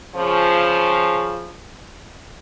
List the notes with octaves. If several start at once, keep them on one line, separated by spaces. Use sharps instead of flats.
C#3 F3